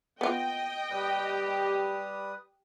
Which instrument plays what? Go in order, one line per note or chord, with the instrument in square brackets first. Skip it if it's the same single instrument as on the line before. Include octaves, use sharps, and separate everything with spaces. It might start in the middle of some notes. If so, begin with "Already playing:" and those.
[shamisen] B3 F4 [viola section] D#5 G5
[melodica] G3 B4 D#6 [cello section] G4